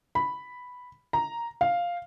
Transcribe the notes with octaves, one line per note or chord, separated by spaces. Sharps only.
B5
A#5
F5